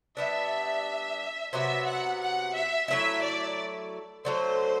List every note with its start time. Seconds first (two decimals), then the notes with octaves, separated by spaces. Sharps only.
0.17 G3 B3 D4 E5
1.53 C3 F#3 B3 F#4 E5
1.86 F#5
2.21 F#5
2.55 E5
2.88 F#3 A3 C4 E4 E5
3.23 D5
4.25 D3 F#3 A3 C5